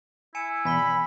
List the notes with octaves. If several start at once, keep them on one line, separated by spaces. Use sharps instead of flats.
E4 G#5 C#7 E7
E2 B2 G#5 B5 B6 G7